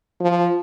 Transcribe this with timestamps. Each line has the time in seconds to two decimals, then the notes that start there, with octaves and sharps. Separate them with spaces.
0.20 F3